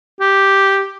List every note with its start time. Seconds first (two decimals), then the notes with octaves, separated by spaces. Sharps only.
0.21 G4